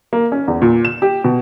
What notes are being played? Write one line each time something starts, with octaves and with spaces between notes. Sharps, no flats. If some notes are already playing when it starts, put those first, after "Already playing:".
A#3
C#4
E2
A#2
E7
G4
B2